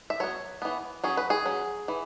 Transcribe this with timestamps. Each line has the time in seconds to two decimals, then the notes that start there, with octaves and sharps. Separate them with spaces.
0.10 E5
0.20 F#3 B3 C#5
0.62 E3 B3
1.04 F#3 C#4 G#4
1.17 B4
1.30 G#4
1.45 F#3 C#4
1.88 E3